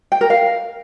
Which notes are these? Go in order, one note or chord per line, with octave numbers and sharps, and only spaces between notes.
G5
A#4
F5